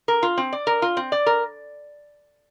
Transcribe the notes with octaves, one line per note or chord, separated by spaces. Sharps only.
A#4
F4
C4
D5
A#4
F4
C4
D5
A#4